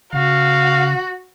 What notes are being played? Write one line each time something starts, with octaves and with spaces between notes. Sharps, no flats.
C#3 F#4 F5